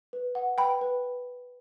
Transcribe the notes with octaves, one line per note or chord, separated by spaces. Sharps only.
B4
F#5
B4 G5 B5
B4